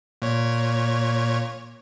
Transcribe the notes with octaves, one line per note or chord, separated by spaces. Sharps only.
A#2 C#5